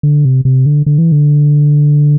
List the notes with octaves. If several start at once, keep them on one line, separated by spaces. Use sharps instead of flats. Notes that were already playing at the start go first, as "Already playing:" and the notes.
D3
C3
C3
D3
D3
E3
D3